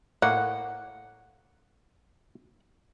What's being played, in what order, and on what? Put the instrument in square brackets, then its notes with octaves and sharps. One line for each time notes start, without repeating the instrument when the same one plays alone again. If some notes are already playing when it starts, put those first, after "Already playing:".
[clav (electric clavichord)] A2 A#3 [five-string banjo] F#5